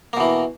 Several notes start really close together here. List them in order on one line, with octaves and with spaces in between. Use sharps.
A#3 B2 E3